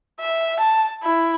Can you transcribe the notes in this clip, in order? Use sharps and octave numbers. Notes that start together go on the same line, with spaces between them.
E5
A5
E4